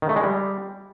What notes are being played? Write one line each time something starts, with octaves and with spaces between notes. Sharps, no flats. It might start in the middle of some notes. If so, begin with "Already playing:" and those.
D#3
A3
G#3
G3